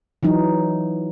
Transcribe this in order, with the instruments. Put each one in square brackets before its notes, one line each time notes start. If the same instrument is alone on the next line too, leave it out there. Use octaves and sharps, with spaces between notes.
[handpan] E3 F#3 D#4